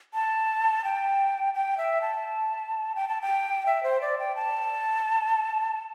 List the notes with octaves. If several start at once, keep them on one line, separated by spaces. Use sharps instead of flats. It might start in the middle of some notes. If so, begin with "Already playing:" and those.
A5
G5
G5
E5
A5
G5
A5
G5
E5
C5
D5
G5
A5